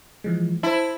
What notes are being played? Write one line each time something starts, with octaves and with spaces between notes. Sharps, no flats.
E3 F3 G#3
E4 C5 A5